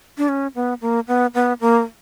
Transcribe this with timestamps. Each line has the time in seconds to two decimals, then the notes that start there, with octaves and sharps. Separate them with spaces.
0.18 D4
0.29 C#4
0.55 B3
0.81 A#3
1.08 B3
1.35 B3
1.61 A#3